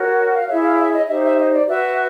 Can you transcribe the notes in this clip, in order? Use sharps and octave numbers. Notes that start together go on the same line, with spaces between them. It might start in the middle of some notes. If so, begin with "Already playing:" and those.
Already playing: F#4 A#4 C#5
F5
E4 G#4 C#5 E5
F5
E5
D#5
D#4 G4 C5 E5
E5
D#5
D5
F#4 B4 E5